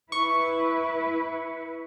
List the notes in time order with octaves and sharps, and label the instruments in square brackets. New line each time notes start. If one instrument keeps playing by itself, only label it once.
[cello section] E4 B4 [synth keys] C#6